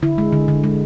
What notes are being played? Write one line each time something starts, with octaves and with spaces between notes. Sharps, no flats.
D3 E4
G#3
D3
D3
G#3